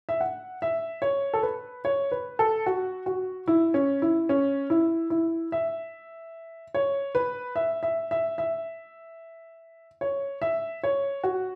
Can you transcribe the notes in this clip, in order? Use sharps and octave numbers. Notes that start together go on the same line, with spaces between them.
E5
F#5
E5
C#5
A4
B4
C#5
B4
A4
F#4
F#4
E4
C#4
E4
C#4
E4
E4
E5
C#5
B4
E5
E5
E5
E5
C#5
E5
C#5
F#4